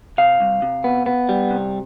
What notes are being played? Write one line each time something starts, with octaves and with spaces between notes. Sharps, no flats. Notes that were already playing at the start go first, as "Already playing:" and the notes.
C3 F5
C2
C3
B3
B3
G3
C3